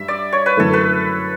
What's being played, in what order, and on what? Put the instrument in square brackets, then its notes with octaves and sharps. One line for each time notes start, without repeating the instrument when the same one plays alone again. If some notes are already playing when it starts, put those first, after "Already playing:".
Already playing: [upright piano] G2 [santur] E5
[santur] D5
C#5
B4
[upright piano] F#2 D3 A3 E4 [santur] A4
[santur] B4